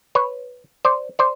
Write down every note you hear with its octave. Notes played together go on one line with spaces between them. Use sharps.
B4 C#5
C5 D5
C5 D5